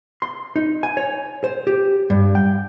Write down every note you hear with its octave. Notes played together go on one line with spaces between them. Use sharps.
C6
D#4
G#5
C#5
C5
G4
G2
G5